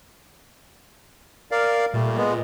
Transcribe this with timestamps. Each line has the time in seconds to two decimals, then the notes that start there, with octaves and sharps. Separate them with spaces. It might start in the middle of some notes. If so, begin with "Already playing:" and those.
1.51 A#4 D5 F5
1.94 A#2 G3 A3
2.17 G#3 B3